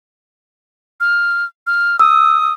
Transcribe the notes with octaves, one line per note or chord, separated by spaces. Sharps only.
F6
F6
D#6 E6